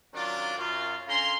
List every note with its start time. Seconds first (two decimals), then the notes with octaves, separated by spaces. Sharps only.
0.14 D#3 F#3 C#4 D4 F4 D5
0.58 F#2 F4
1.08 D3 C#4 F5 A#5 C6